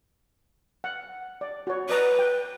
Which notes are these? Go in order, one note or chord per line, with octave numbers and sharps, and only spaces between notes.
F#5
D5
F#4 C#5
B4 D5 D#5 A#5
G5